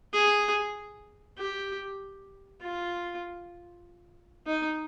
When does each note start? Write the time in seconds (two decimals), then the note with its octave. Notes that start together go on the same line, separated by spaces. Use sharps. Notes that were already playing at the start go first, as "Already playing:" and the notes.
0.13 G#4
1.37 G4
2.61 F4
4.46 D#4